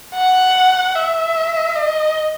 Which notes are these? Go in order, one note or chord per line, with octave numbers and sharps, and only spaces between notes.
F#5
E5
D#5